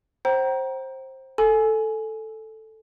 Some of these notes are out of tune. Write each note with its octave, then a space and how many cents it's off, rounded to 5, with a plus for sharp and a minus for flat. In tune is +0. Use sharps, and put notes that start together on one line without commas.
C5 +15 G5 -40 A#5 +20
A4 +0 G#5 +15